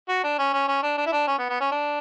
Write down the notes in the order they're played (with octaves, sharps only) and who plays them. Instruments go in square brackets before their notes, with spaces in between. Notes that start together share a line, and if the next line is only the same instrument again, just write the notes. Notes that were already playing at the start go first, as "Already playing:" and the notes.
[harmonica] F#4
D4
C#4
C#4
C#4
D4
D4
E4
D4
C#4
B3
B3
C#4
D4